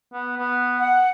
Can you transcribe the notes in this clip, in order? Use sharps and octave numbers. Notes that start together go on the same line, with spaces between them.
B3
B3
F#5